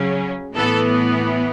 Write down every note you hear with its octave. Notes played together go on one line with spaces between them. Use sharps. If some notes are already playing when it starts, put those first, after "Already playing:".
Already playing: C#3 F#3 C#4
A2 E3 B3 A4